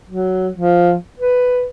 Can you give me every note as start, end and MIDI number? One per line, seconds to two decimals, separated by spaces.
0.09 0.49 54
0.54 0.95 53
1.19 1.66 71